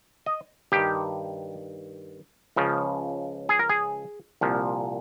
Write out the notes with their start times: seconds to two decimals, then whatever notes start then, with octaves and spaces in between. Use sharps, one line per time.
0.26 D#5
0.72 G2 D#3 G4
2.56 C#2 C#3 F3
3.49 G#4
3.59 A#4
3.69 G#4
4.41 C2 A#2 F3